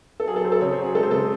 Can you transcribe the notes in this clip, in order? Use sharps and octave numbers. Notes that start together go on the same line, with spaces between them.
A4
F#3 G#4
A4
F#3 C5
A4
C#3 C#5
C5
F#3
G#4
G#3 A4
C5
C#3 A4